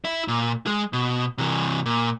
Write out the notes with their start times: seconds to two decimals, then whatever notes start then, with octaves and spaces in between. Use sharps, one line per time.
0.05 E4 E5
0.28 A#2
0.66 G#3 G#4
0.93 B2
1.38 C3 E3
1.86 A#2